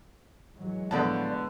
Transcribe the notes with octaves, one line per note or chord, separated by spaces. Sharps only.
E3 F#3 G#3
A2 D3 F3 B3 D5 A5